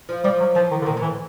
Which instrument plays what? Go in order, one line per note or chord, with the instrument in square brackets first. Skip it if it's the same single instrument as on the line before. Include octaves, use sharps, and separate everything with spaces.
[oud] F3
[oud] F3 [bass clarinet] G3
[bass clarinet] F#3
[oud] E3 [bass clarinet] F3
[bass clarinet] D#3
D3
[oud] A#2 [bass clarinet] D#3
[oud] A2 [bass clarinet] E3